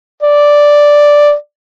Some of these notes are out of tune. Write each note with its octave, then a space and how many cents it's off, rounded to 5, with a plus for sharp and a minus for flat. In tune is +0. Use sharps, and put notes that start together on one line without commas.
D5 +0